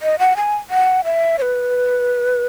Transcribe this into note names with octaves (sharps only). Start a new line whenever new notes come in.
D#5
F#5
G#5
F#5
E5
C#5
B4